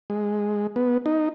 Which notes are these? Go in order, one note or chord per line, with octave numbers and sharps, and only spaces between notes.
G#3
B3
D#4